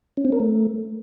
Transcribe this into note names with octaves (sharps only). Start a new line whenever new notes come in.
C#4
C4
A#4
A3